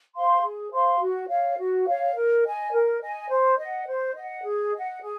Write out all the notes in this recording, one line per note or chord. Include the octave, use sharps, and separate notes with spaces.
C5 F5 C6
G#4
C5 F5 C6
F#4
C#5 F5
F#4
C#5 F5
A#4
D#5 G#5
A#4
D#5 G#5
C5
D#5 F#5
C5
D#5 F#5
G#4
D#5 F#5
G#4